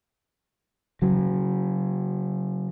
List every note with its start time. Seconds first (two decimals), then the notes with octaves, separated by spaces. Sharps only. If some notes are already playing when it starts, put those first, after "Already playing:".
1.02 C#3 F#3